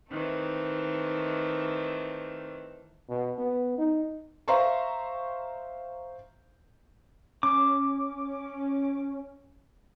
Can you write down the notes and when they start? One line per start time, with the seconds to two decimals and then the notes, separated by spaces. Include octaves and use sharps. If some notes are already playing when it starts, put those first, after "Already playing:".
0.11 D#3 E3 A3 C4
3.09 B2
3.38 B3
3.78 D#4
4.48 C5 E5 F5 A#5 C6 C#6
7.43 C#4 D6